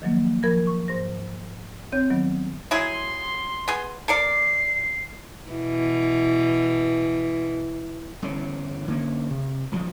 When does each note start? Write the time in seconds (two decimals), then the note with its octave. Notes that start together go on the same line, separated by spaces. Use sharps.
0.02 D#3 F3 F#3 A#3
0.43 F3 A#4 B5 G#6 A#6
0.67 C#6
0.88 G#2 C5 A#6
1.92 D#2 C4 C#5 G6
2.10 D#3 F#3 B3
2.71 F#3 E4 G#4 C6
3.68 B3 G#4
4.08 A4 A#4 D5 C7
5.50 B2 E3
8.22 G1 E2 C#3 C#4
8.88 D3 A#3 C#4
9.30 C3
9.71 D#1 C#2 D3 F3